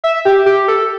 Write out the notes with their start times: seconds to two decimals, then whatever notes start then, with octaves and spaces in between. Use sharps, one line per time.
0.04 E5
0.25 G4
0.46 G4
0.68 A4